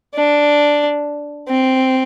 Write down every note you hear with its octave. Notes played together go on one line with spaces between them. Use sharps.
D4
C4